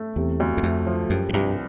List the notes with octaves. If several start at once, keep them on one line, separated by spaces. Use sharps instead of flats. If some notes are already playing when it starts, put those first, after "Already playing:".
Already playing: A3
E2 C3
D2
E2
F2 A3
F3
F#2 G3
G#2
C2 G2